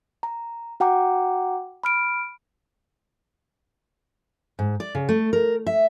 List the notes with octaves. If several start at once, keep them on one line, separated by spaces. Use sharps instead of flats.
A#5
F#4 F#5 G5 A#5 D6
B5 F6 D7
G#2
D5
C#3
A3
A#4
E5